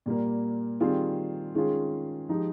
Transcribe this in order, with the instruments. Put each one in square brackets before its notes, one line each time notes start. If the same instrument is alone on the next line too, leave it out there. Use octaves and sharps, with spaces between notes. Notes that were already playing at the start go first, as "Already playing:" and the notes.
[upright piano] A#2 G3 A#3
D#3 G3 C4 F4 G#4
D#3 G#3 C#4 F4 G#4
F3 G#3 D#4 G4